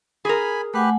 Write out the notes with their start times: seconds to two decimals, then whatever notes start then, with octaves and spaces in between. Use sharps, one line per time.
0.25 G#4 A#4 G#5 B5
0.74 A3 G4 B4 F#5 G#5